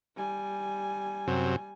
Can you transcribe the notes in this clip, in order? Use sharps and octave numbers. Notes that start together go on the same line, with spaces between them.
G3 G#5
F#2 C3